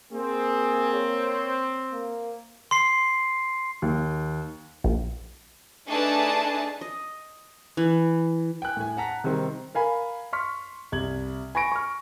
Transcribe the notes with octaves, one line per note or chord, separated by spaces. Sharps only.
A#3 C4 G#4
C#5
A#3
C6 C7
D#2
A#1
A3 D4 D#4 G#4 B4 A5
D#5
E3
G5 G#5 F#6
A2 G#5
F#5 A5 A#5 B6
C3 D#3 G3 C4
A#4 F5 G#5 B5
C6 C#6 F6 B6
C2 G#6 F#7
G#5 B5 C#6 A#6 D7
C#6 F6